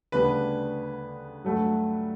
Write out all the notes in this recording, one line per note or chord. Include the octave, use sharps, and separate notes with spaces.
D2 C#3 G3 B3 D4 B4
G2 F#3 A3